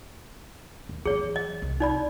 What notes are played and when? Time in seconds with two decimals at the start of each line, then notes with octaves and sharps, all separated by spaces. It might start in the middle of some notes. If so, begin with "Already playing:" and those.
0.89 D#2
1.05 E3 F#3 G#4 C#5
1.36 D#5
1.62 C2
1.80 D#4 D5 B5